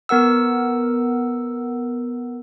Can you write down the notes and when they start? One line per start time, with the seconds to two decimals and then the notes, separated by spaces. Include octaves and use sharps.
0.09 B3 A#4 F#5 E6